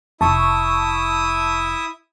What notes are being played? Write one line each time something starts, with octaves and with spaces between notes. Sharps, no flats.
F1 E4 E5 A5 C#6 D#6